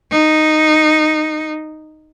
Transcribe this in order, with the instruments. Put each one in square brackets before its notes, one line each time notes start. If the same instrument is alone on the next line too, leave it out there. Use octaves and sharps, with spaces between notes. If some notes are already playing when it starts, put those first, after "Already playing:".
[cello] D#4